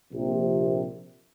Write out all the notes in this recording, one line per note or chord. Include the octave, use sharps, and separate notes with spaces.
A#1 C3